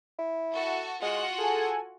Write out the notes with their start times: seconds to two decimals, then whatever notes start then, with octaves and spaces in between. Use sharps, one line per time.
0.19 E4
0.52 F#4 A4
1.02 G#3 F4 F#4 F#5
1.38 G#4 A4 G#5